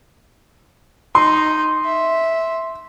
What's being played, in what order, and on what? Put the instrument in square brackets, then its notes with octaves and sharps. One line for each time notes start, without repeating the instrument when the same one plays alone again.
[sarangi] D#4 [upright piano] C6
[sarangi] E5